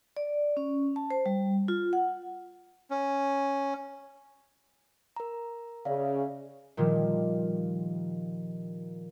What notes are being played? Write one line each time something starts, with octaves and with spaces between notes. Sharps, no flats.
D5
C#4
A5
C5
G3
F4
F#5
C#4
A#4 A#5
C#3 D5 E5 F5
A#2 D#3 F3 G3